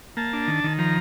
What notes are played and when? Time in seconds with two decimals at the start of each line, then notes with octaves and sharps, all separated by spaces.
0.17 A#3 A5
0.33 D4
0.48 D#3
0.64 D#3
0.79 F3 A#5